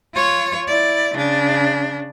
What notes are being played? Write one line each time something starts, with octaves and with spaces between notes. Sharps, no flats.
F4 C#5
E4 D5
C#3 D4